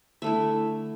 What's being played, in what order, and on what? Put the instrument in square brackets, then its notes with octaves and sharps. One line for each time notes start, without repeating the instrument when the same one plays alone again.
[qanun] D3 A3 E4 E5